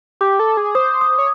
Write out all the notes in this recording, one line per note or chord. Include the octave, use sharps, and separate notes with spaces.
G4 D6
A4
G#4
C5 D#6
D#6
C#5